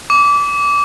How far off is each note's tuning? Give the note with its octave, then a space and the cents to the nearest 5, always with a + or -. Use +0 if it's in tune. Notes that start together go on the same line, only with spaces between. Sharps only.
D6 -25